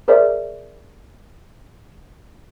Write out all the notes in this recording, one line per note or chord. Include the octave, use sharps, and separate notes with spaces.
G#4 A#4 C5 D5 E5